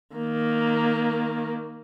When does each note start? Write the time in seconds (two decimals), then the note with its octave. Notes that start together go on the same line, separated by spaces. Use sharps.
0.15 D#3 A#3